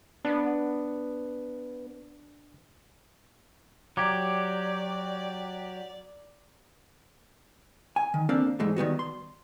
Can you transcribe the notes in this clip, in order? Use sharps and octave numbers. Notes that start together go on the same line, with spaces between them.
B3 D4
F#3 G4 D5 A#5 D6 G#6
G#5
D#3
A#3 C4 D4 A4 A#4 F5
G#2 E3 G#3 A3
D#3 G3 B3 F#4
C6